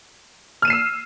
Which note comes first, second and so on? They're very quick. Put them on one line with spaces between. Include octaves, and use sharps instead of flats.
F6 D#7 E7 C7 E6